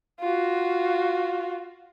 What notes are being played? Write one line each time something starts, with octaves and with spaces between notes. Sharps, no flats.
F4 F#4